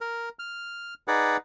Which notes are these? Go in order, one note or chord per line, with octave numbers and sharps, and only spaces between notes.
A#4
F6
D#4 G#4 B4 D5 F#5